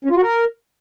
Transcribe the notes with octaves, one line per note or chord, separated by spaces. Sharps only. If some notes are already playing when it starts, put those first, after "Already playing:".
C#4
F4
F#4
A#4